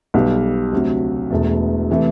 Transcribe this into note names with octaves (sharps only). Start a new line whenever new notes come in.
B1 B2 G3
D2 C3 F#3
E1 E2 B2 A3
C3 E3 A3